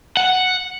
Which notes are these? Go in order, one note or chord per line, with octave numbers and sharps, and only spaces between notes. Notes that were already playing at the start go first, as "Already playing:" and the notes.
F#5